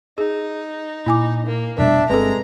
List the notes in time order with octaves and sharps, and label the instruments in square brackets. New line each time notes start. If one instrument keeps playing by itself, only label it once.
[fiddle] D#4 [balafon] G#4
[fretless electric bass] A#2 [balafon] E4 G#5 D6
[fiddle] A#3
[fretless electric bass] F1 B2 G3 [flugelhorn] D4 [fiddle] E5
[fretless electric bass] G1 C4 [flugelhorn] G#3 [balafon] A4 B4 [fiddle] A#5